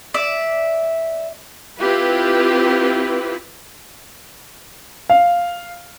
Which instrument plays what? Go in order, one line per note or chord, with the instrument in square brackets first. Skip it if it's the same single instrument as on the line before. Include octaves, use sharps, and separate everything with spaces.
[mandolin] D5 E5
[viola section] C4 E4 F4 G4 B4
[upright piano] F5